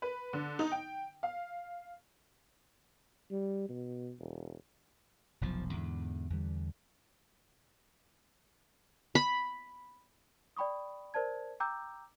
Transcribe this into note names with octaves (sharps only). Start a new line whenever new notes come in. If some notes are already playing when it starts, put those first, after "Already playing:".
B4
D3
D#4
G5
F5
G3
B2
E1
F1 B1 B2 F3
E2 G#2 D3
E2 D3 G3
B5
D5 G5 B5 C#6 D#6
A#4 C5 D5 A5 G#6
G5 A#5 D6 E6 G6